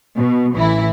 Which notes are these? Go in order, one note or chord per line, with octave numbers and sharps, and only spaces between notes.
B2
A1 E3 E4